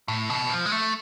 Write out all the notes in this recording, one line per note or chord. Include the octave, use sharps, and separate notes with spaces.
A2
B2
F3
G#3
A3